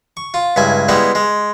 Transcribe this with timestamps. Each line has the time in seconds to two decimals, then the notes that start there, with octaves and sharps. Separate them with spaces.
0.17 C#6
0.34 F4
0.56 C#2 G2 E4 G#5
0.88 G3 G#3 B3 E4
1.15 G#3